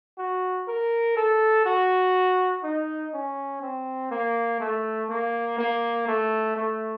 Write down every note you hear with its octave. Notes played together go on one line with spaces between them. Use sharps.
F#4
A#4
A4
F#4
D#4
C#4
C4
A#3
A3
A#3
A#3
A3
A3